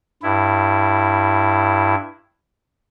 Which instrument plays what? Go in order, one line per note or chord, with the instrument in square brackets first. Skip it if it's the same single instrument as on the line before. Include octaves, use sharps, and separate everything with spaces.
[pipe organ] G2 E4